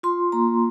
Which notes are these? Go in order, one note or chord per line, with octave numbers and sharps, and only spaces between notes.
F4 C6
A#3 A#5